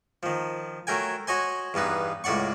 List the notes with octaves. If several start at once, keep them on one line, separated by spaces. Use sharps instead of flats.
D#3 F3
F#3 A3 A#4 G5 G#5
F#4 C#5 D#5 G#5 C6
E2 G2 B3 D#4
C#2 A2 D5 F#5 C#6